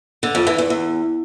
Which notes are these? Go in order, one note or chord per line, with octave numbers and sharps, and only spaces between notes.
D3
F2
E3
E2
E2